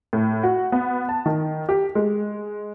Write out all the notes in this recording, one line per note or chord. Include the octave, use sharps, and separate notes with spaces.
A2
F#4
B3
A5
D#3
G4
G#3